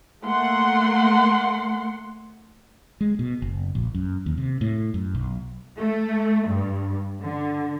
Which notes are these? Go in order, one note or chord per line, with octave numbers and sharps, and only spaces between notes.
A3 A#3 F#5 C6
G#3
B2
F#1
A#1
F#2
D#2
C3
A2
F#2
B1
A3
G2
D3